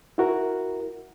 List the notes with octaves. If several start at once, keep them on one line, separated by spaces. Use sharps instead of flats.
E4 F#4 A#4